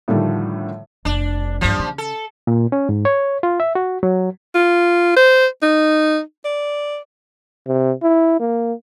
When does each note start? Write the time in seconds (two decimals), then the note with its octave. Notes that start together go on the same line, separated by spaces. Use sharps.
0.08 A2 D3 D#3 F3 G3 A3
1.05 F1 D4
1.61 E2 G2 F3 G3
1.79 C#3
1.98 A4
2.47 A#2
2.72 C#4
2.89 G#2
3.05 C#5
3.43 F4
3.60 E5
3.75 F#4
4.03 F#3
4.54 F4
5.17 C5
5.63 D#4
6.45 D5
7.67 C3
8.03 E4
8.40 A#3